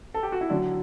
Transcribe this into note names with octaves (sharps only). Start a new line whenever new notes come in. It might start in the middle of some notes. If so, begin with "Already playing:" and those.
A4
G4
F#4
E4
D3 F#3 D4